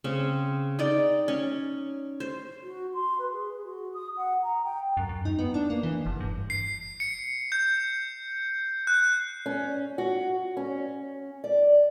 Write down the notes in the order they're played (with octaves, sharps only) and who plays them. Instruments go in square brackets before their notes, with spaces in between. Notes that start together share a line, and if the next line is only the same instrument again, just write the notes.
[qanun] C#3 C4 C#4
D#4 D5 G5
C#4
C5
[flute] F#4
C6
B4
G#4
F#4
D#6
F#5
A#5
G5
[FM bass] F#2
F#2
D#4
B3
D4
A#3
E3
F#1
G2
[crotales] C7
C#7
G6
F#6
[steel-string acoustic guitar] C#4
F#4
C#4
D5